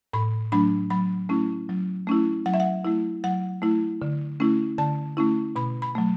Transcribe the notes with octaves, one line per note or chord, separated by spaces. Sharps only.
A2 B5
F#3 A3 D4 B5
F#3 B5
A3 C#4 E4
F#3
A3 C#4 E4
F#3 F#5
E5
F#5
A3 E4
F#3 F#5
A3 E4
D3
A3 C#4 E4
D3 A5
A3 C#4 E4
B2 B5
B5
F#3 A3